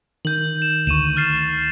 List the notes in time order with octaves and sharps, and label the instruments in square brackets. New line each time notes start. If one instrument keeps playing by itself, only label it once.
[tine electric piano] D#3 [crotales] G6 F#7
[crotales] E7
[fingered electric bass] D2 [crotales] C#6 D#7 E7
[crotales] F6 A6 C7